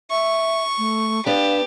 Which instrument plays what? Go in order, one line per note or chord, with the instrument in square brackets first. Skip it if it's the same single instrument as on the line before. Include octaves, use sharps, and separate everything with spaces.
[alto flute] E5 [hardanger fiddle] C#6
[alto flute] A3
[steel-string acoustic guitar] B3 D4 [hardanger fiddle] G4 [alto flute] F5